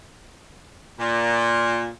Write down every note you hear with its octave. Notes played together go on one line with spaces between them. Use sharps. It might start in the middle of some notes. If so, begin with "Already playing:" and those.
A#2